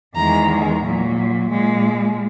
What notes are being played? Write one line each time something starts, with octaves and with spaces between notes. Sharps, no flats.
E2 D#3 G#3 A#5
A#2 F#3
A#2 G#3